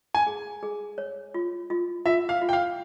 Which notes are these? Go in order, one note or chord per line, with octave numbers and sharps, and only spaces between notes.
G#5
G#4
G#4
C#5
F4
F4
F4 E5
F5
F4
G5
F5